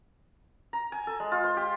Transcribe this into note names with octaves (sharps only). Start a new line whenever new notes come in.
A#5
G#5
A4
G#3
F4
C5
G4